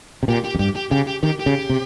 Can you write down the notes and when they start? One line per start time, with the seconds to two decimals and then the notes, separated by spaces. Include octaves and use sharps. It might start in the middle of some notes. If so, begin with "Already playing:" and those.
0.23 C3
0.28 A#2 G4
0.44 G4
0.55 F2
0.59 G2 G4
0.76 G4
0.91 C#3 G4
1.07 G4
1.23 D#3 G4
1.40 G4
1.46 C#3
1.70 C3